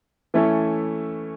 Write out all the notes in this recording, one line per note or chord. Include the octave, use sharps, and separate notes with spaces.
E3 A3 C#4 E4 A4